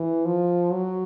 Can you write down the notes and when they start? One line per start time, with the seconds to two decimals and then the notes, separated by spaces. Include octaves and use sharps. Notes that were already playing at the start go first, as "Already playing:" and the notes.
Already playing: E3
0.26 F3
0.72 F#3